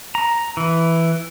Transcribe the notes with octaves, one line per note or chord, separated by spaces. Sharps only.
A#5
E3